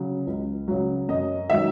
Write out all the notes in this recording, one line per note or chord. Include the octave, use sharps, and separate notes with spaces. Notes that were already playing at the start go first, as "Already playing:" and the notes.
Already playing: C#3 F#3
C#2
C#3 F#3
F#2 D#5
D#3 F#3 E5